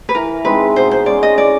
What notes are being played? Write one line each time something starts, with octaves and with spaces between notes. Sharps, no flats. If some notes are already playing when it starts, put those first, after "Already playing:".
B4
E3 A#4
G#3 C4 D#4 B4
B2 C5
C5
G#3 C#4 D5
D#5
A2 D5